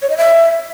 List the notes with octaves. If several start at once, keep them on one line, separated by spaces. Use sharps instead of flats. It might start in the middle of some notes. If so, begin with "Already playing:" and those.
C#5
D#5
E5